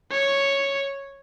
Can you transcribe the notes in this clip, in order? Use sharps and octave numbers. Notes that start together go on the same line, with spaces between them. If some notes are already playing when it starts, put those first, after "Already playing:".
C#5